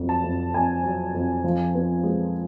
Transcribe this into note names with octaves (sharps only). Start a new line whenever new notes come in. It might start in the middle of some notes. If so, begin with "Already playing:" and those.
Already playing: F2 F#3
A5
F2
F2 G#5
F#3
F2
F3
B3
G#3